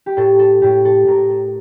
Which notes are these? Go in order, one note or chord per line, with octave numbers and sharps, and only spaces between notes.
G4
A2 A4
A4
A2 G4
A4
A2 A#4
A4